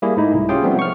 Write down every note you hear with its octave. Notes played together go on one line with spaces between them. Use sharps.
G3 A#3 E4 G#4
G#2 A3 D#4 E4
C2
C#4 F4 G4 G#4 G5
F3 G3 A3 B3 C4
C#6 F6